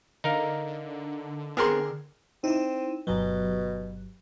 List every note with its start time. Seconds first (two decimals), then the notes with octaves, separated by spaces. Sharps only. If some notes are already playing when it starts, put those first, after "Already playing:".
0.24 D3 D#4 A#4 F5
1.57 B3 C4 G#4 A#4 F#5 C6
2.44 C4 D#4 E4
3.07 G1 B2 F#3